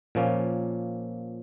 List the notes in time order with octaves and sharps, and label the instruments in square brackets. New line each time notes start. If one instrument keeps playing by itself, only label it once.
[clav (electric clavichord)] A#2 F3 A#3 C#4